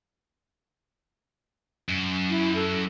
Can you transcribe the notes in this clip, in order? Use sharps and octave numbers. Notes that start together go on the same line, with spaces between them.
F#2
E4
A4